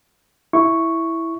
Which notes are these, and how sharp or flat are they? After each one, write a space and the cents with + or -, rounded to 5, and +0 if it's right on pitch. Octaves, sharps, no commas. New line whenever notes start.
E4 +0 C#6 +0